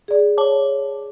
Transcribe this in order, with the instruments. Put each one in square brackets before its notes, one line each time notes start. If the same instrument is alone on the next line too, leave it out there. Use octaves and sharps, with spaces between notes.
[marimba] G#4 D5
[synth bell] C#5 A5 D6